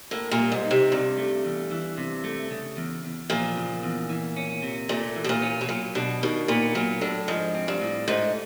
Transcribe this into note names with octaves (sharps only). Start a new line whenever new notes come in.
A2 A#3
A#2
G3
G#2
D#4
C3
G2 C3
A3
E2
E3
C3
A3
C#3
E2
E2
A#2 F3
C#3
E2
E3
C#4
C3
A#2 A3
E3
B2
A#2
C#4
B2
A#2 F#3
B2 D4
B2 D#3
A#2 B3
A#2 F#3
A2 D4
G#2 F3
C4
G2
A2
G#2 A3